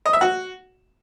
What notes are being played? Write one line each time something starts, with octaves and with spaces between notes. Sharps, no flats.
D#5
E5
F#4